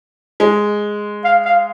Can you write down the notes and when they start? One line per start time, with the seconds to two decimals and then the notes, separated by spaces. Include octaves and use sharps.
0.40 G#3
1.25 F5
1.46 F5